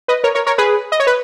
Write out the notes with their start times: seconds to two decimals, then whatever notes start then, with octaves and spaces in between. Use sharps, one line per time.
0.08 B4 D#5
0.24 A#4 C#5
0.35 A#4 C#5
0.46 A#4 C#5
0.58 G#4 B4
0.92 D#5
1.00 C#5
1.07 B4